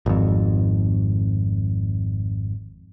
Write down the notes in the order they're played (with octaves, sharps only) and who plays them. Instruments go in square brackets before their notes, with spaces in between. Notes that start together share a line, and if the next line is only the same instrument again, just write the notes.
[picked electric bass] G#1 F2